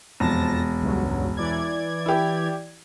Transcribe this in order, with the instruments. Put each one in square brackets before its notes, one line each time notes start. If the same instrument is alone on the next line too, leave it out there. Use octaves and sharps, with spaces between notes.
[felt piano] E1 [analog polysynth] F2 A5 A#6
[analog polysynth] C#2 G2 F#3
E3 D5 G#6
[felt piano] E4 G4